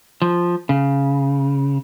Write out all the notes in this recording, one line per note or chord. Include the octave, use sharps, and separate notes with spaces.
F3
C#3